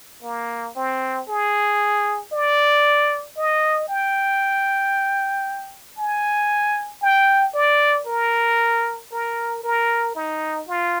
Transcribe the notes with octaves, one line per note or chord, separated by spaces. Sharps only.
A#3
C4
G#4
D5
D#5
G5
G#5
G5
D5
A#4
A#4
A#4
D#4
F4